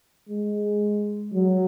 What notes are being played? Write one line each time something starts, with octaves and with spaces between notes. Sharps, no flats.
G#3
F#3